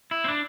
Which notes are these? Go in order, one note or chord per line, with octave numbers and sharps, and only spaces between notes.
E4
C4
D4